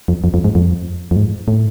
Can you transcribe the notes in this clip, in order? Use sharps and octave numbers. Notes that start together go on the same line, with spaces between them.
F2
F2
F2
G#2
F2
F2
G#2
A2